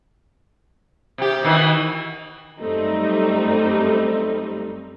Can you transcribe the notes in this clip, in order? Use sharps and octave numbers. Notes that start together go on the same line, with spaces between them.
C3 G4
B2 D#3 E3
F#2 G3 A3 C4 D#4